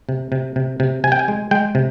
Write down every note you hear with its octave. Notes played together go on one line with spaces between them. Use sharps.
C3
C3
C3
C3
C3 G#5
G5
G#5
G#3
G#3 G5
C3